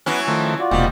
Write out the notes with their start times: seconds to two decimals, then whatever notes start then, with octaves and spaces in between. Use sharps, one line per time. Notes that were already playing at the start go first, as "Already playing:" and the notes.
0.06 E3 F#3 B3 C#4
0.28 D#3 F3 A3
0.60 F4 F#4 D5
0.71 E1 C3 G3 A#3 D#4